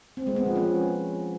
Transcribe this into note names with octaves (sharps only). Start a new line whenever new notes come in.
C4
G#3
B3
F3
C#4